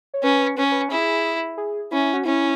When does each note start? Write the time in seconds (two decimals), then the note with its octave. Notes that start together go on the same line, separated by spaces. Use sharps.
0.14 C#5
0.23 C#4 B4
0.57 C#4 B4
0.64 C#5
0.72 B4
0.90 E4 G#4
1.57 G#4
1.91 C#4 E4
2.14 F#4
2.25 C#4 E4